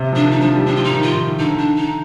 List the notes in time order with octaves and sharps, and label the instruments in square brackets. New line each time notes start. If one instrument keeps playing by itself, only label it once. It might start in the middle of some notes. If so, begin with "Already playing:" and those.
Already playing: [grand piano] C3
F3
[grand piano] D#3 [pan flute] D4
[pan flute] D#4
[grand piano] F3 [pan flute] D4
[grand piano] G3
[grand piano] F3 [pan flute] D4
[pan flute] F4
[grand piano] F3
[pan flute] D#4
[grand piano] D#3
[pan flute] F4
[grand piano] D#3
[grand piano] D3 [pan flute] D#4
[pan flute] D4
D#4